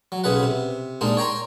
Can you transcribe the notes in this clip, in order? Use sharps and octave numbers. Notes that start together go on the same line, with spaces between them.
F#3
B1 C#3 G#4 B4 F#5
C3
A#2 G#3 D4 D#4
C#5 G5 A#5 C6